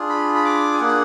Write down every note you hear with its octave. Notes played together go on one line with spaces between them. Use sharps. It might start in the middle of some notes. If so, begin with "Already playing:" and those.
Already playing: D4 F4 G#4
B5
B5
D6
G#5
A#3 D4 G#4 F#5